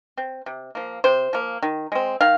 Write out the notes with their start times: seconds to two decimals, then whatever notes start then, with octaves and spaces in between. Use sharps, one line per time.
0.17 C4
0.46 C3
0.75 F3 A#3
1.04 C3 C5
1.33 F3 A#3
1.63 D#3
1.92 G#3 C4
2.21 D#3 F5